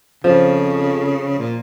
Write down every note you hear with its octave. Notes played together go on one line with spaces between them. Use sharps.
F2 C#3 F3
A#2